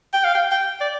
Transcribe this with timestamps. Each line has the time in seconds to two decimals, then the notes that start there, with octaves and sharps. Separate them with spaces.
0.13 G5
0.25 F5
0.35 G5
0.51 G5
0.80 D5